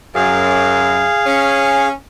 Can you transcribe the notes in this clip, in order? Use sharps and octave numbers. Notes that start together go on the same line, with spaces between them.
F#2 G#4 F5
C#4